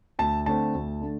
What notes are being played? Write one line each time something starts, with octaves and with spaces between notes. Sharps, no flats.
D2 A5
D3 A3 C4 A5
D2
D3 A3